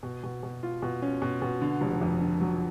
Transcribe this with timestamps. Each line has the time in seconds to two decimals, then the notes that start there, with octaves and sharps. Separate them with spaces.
0.03 B2
0.23 B2
0.43 B2
0.63 F4
0.82 B2
1.02 C#4
1.22 B2
1.42 B2
1.62 D3
1.81 F1
2.01 F2
2.20 D3
2.41 F#3